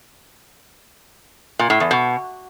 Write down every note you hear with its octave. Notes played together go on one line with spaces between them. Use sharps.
A#2
A2
E2
B2